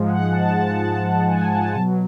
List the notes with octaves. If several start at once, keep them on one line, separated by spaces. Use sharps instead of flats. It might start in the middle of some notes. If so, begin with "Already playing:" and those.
Already playing: G#2 F3 G#3
F#5
A5
A5
A5
G#5
A5
B2 F#3 A5